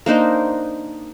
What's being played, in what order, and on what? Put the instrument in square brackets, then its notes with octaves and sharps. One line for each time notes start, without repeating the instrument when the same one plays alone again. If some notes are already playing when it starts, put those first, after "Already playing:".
[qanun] A#3 D4 D#4 C5